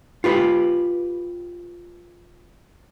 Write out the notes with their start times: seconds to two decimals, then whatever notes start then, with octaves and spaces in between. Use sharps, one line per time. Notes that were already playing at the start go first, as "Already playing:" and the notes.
0.24 F4 G4 B4